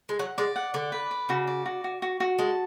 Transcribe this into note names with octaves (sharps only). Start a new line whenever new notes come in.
G#3
F#3 F#5
G#3 D5
F#5
D3 D5
B4
D5
C#3 F#4
D5
F#4
F#4
F#4
F#4
G#3 A5